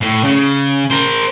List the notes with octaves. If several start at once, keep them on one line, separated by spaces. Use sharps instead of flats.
A2
C#3
A#4 C5